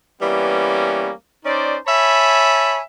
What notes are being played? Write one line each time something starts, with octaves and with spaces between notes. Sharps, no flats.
E3 G3 A#3 B3 C#4
C#4 D#4 C5 D5
C#5 E5 G#5 A5 B5